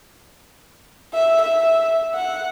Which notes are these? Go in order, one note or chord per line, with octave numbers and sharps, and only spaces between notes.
E5
E5
F#5